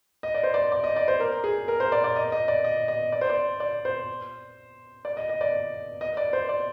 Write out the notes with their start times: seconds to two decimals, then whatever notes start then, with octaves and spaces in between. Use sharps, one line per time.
0.23 D#5
0.34 D5
0.43 C5
0.54 D5
0.72 D5
0.84 D#5
0.96 D5
1.08 C5
1.20 A#4
1.44 G#4
1.68 A#4
1.80 C5
1.92 D5
2.04 D5
2.16 D#5
2.32 D#5
2.48 D5
2.64 D#5
2.88 D#5
3.12 D5
3.21 C5
3.29 D5
3.60 D5
3.85 C5
5.05 D5
5.17 D#5
5.29 D#5
5.41 D5
6.01 D#5
6.17 D5
6.33 C5
6.49 D5